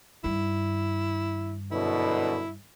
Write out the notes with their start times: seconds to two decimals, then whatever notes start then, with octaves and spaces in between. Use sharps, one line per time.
0.24 G2 D#3 E4
1.72 F#2 B2 D3 E4